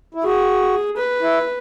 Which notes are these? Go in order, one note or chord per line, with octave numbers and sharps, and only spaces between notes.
E4
F#4 G#4
B4
E4